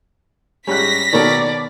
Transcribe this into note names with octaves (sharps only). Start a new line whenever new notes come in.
G#2 G3 C#4 F#6 A#6 B6
B2 D#3 A4 A#4 C#5 D5